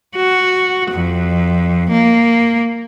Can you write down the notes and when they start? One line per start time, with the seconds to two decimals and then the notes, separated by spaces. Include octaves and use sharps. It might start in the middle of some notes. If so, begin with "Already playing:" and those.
0.16 F#4
0.91 F2
1.91 A#3